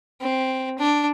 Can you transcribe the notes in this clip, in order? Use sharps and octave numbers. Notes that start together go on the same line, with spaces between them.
C4
D4